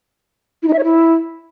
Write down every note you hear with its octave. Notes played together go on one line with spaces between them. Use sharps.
E4
D#4
E5
C#5
E4